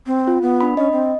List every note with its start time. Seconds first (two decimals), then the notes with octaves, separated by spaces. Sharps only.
0.06 C4
0.28 F4
0.42 B3
0.61 D4 B5
0.77 C#4 D#5
0.92 C4